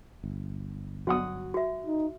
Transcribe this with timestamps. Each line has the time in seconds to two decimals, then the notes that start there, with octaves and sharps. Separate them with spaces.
0.24 G1
1.07 F#3 F#4 F#5 D#6
1.54 F#4 E5
1.86 D#4